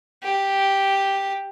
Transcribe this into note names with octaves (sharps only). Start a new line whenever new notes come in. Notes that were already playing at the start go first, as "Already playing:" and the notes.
G4